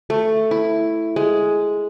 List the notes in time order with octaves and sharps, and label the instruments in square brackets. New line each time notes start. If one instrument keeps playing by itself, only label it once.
[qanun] A3
E4
G#3